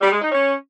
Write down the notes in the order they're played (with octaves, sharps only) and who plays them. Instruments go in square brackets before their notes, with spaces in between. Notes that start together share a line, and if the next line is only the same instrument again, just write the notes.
[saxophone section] G3
G#3
D#4
C#4